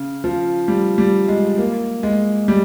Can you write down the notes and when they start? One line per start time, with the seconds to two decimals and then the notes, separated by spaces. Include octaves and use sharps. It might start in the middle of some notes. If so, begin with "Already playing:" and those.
Already playing: C#3
0.24 F3
0.68 G3
0.98 G3
1.28 G#3
1.58 A#3
2.03 G#3
2.48 G3